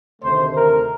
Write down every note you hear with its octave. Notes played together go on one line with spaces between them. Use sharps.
D2 C3 D#3 A3 C5
A#4